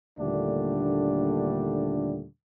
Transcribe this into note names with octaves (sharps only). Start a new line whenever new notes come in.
D#2 A#2 D3 G3 A3 D4